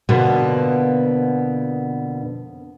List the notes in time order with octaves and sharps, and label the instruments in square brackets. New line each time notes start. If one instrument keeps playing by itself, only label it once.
[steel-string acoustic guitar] F2 B2 D3 A#3 B3